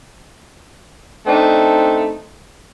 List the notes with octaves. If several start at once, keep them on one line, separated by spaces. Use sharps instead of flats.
A3 C4 D4 D#4